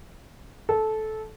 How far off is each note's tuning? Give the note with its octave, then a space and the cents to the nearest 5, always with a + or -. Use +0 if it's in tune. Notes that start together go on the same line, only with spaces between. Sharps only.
A4 -15